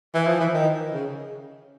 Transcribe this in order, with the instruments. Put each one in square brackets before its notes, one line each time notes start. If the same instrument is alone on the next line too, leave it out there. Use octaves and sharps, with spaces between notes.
[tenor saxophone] E3
F3
E3
D#3
C#3